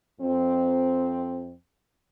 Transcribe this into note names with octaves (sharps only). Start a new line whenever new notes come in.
F2 C4